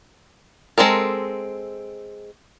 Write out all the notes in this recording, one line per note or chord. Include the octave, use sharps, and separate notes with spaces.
G#3 C4 A4 A#4